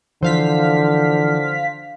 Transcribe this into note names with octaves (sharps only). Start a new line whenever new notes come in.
D3 E3 F3 C5 F5 B6